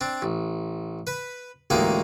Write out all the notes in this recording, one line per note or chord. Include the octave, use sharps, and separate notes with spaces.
C4 D4
A1
B4 B5
A1 D2 G#3 A#3 D#4 G5